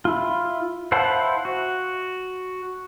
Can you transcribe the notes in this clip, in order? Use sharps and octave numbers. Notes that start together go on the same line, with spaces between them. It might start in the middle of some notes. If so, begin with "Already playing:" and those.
E4 F4
E4 C5 F5 F#5 A5
F#4